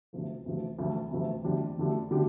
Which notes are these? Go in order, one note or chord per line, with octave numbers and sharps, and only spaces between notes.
D2 C3 F3 A3
D2 C3 F3 A3
D2 C3 F3 A3
D2 C3 F3 A3
F2 D3 A3 D4 G4
F2 D3 A3 D4 G4
D3 A3 D4 G4